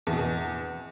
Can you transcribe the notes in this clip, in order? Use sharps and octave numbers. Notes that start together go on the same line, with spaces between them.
E2
B2
E2